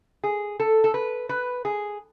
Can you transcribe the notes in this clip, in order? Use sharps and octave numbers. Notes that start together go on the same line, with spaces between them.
G#4
A4
A4
B4
B4
G#4